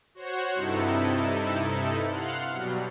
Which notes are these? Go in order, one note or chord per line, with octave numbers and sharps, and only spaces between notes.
F#4 C5 C#5 F#5
G2 C3 D#4 E4 A4
F5 F#5 C6 F6 F#6
B2 F#3 G3